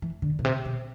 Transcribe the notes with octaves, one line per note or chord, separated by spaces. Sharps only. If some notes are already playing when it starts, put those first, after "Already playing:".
E3
D3
B2
C3
B2